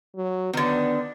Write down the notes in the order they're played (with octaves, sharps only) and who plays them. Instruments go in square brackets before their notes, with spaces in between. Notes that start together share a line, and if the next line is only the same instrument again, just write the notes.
[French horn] F#3
[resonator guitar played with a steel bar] D3 D#3 [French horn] B3